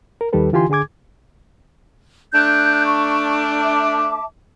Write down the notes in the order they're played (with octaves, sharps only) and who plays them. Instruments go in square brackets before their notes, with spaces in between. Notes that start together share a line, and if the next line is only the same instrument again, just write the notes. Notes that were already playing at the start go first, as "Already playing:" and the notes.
[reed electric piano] A#4
D#2 D#3 G3 G4 A4 B4
D3 E3 F4 G4 G#5 C6
D3 G#4 G#5 D6 G#6
[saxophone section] A3 D4 [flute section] F#6 G6
[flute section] C#6
E5 A5 D6